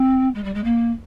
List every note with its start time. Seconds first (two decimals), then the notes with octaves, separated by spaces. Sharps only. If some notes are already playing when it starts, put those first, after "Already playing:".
Already playing: C4
0.34 G#3
0.44 G3
0.54 G#3
0.64 A#3